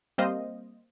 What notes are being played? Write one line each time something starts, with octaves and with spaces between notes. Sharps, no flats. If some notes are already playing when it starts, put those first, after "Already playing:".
G3 A#3 C4 C5 D#5 F5